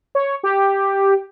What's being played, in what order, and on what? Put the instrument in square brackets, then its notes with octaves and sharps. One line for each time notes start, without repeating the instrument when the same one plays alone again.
[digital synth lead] C#5
G4